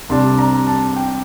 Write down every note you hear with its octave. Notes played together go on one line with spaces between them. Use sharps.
C2 C3 G3 D4 C6
A#5
A5
G5